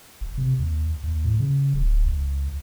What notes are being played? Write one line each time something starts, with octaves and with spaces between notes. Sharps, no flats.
F#1
C3
D#2
D#2
A2
C#3
D1
C#2